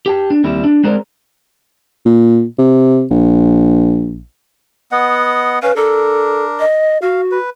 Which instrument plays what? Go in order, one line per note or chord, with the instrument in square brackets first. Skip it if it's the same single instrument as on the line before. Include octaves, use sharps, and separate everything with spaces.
[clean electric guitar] G4 G5 A5
D4
D#2 G3 C4 E4
D4
G#3 C4 G#4 A#4 C5 D5
[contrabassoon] A#2
C3
A#1
[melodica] B3 D#5 F#5
[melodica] C#4 F5 [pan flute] B4
[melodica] D4 A#4 [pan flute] A4
[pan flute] D#5
[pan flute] F#4 [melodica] F5
[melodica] B4